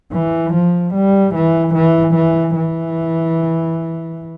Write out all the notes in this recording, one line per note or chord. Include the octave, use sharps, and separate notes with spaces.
E3
F3
G3
E3
E3
E3
E3